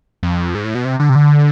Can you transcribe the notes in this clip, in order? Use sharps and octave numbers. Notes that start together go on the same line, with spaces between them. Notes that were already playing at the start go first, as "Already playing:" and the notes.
F2
G#2
A2
B2
C3
D3
C3
D3